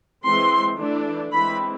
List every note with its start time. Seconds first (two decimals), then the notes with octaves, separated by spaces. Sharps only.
0.23 E3 G#3 C4 C6
0.78 E3 A3 D4
1.31 E3 G#3 C4 B5